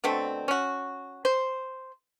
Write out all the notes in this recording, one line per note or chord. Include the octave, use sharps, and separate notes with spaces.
B2 D3 A3 C4
C#4 F#4
C5